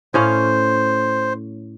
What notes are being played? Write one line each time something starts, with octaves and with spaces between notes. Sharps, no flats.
A2 C#4 C5 F5